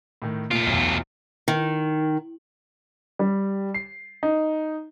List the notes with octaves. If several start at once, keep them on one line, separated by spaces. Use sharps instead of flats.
A2 D#3
A#2 A3 F4 D7
B1 E2
D#3
G3
C7
D#4